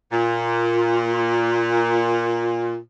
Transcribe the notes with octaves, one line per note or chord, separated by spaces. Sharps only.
A#2 F4